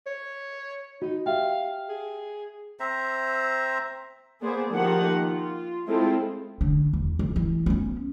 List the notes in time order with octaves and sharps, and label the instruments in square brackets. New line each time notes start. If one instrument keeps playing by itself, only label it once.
[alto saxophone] C#5
[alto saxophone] D#4 [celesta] F#4
[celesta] G4 E5 G5 [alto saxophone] F5
[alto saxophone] G#4
[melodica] C4 C5 E5 A#5
[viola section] A#3 B3 G#4 C5 D5
D#3 F3 A#3 D#4 G4 F#5
F4
G#3 C4 E4 F4 A4
[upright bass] D3
E2
F2
E3
B3 C#4